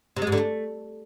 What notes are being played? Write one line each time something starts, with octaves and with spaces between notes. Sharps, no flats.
C3
G#3
G#2
D3
A3